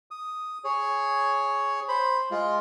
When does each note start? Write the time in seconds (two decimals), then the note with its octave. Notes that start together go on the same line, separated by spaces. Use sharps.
0.11 D#6
0.64 G#4 C#5
1.88 C5 B5
2.31 G#3 F4